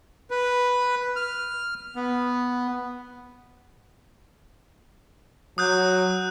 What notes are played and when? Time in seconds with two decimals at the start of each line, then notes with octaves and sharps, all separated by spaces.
0.31 B4
1.16 F6
1.96 B3
5.58 F#3 D#6 F#6 G6